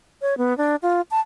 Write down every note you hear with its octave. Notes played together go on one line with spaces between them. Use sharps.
C#5
B3
D4
F4
A5